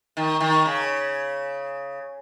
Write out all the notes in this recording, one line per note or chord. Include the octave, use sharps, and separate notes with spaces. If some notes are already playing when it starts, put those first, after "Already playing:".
D#3
D#3
C#3